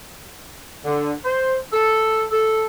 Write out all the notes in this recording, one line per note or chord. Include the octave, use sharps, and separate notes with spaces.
D3
C5
A4
A4